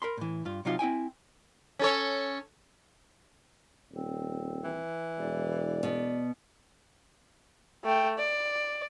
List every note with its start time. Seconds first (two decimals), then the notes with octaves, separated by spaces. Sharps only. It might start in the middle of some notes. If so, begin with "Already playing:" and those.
0.02 A#4 B5 C6
0.17 A2 E3
0.45 G2 F4
0.65 C3 F#3 D#4 F4 F5
0.79 C4 E4 G5 G#5
1.79 C#4 A4 C#5
3.93 D#1 C4
4.65 E3
5.18 E1 D5
5.83 B2
7.85 A3 G5
8.18 D5